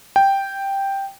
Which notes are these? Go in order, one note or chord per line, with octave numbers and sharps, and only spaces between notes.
G5